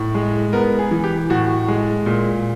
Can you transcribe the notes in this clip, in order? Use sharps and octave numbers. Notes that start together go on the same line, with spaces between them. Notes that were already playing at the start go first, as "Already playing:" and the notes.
Already playing: A2
G#3
B3 A#4
G#4
E3
G4
A2 F#4
G#3
A#2